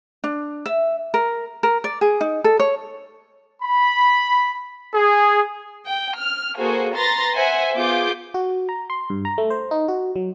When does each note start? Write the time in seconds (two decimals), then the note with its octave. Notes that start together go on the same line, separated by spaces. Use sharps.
0.24 D4
0.66 E5
1.14 A#4
1.63 A#4
1.84 D5
2.01 G#4
2.21 D#4
2.44 A4
2.60 C#5
3.63 B5
4.94 G#4
5.86 G5
6.18 F6
6.58 A#3 F#4 G#4 A4 C5
6.94 B4 A#5 C6 A6 A#6
7.34 C5 E5 F#5 G#5
7.75 B3 F4 G#4 D6 G6
8.34 F#4
8.69 A#5
8.90 C6
9.10 G2
9.25 A#5
9.38 A3
9.50 C5
9.71 D#4
9.88 F#4
10.16 F#3